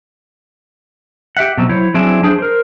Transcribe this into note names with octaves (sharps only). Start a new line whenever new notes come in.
G4 E5 F#5
B2 F#3 C4
F#3 E4 C5 C#5
F#3 C4 D4 E4 G#4
F#3 D4 G#4 C5
A#4 C5